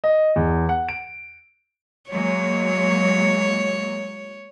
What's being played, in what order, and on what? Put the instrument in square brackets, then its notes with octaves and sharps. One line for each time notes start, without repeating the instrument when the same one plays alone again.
[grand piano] D#5
E2
F#5
D7
[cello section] F#3 G#3 A#3 [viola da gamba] C#5